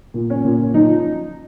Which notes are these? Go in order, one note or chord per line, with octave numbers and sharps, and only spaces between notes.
A#2
C#4
A#2
F3 D#4